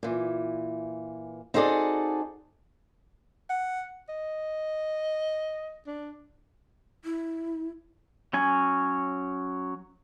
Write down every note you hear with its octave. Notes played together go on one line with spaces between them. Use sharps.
A#2 E3
C4 D#4 F#4 G#4 A4 D5
F#5
D#5
D4
E4
F#3 C#4 G#5